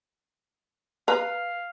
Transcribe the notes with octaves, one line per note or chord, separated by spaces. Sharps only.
B4 F5 A#5